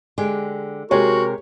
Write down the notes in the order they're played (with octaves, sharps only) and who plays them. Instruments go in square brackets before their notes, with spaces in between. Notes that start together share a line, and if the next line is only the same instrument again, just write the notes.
[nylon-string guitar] D3 G#3 G4
[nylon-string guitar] C3 G#3 [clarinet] F#4 [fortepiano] G4 C#5 [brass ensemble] A#4